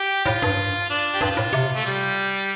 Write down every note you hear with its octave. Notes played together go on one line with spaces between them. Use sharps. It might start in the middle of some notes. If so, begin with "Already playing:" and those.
Already playing: G4
A2 F4
G2
D4
G4
G2 F4
A2
C3
A3
G3